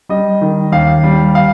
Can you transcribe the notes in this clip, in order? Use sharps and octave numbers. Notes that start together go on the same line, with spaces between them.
G3 D#5
D#3
D#2 F5
G3
F5